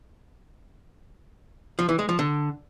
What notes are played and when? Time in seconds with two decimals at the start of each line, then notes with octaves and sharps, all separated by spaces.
1.79 F3
1.89 E3
1.99 G#3
2.09 F3
2.19 D3